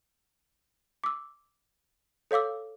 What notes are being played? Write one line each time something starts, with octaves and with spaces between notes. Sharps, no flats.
D6 E6
A4 C#5 F5 D6 E6